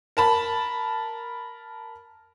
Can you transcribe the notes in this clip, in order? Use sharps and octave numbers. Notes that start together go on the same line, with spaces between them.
A#4 A5 B5